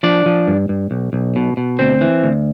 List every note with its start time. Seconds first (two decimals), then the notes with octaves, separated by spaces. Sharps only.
0.03 F3 D4 D5
0.26 F3
0.48 G2
0.69 G2
0.91 B1
1.13 B1
1.36 B2
1.57 B2
1.79 D2 C4 C5
2.01 E3
2.23 D2